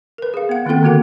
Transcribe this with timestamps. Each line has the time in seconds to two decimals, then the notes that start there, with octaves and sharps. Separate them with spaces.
0.18 A#4 B4
0.34 G#4 F5
0.49 B3 F#5
0.66 D#3 A#3 C4 F4 A4 G5
0.82 D3 A#3 B3 F#4 A#4 F#5